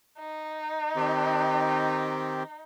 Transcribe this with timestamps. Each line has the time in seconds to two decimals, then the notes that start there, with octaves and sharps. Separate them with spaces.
0.19 D#4
0.96 D#3 C4 G4